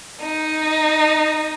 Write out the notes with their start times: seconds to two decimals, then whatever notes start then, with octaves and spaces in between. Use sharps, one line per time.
0.22 D#4